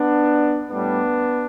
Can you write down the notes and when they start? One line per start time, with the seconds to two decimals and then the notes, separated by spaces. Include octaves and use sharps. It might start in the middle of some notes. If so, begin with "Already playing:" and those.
Already playing: B3 D4
0.70 A2 G3 B3 D4